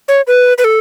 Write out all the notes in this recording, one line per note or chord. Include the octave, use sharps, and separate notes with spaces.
C#5
B4
B4
A4